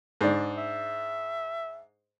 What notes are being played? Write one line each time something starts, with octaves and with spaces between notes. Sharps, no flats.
G#2 D4
E5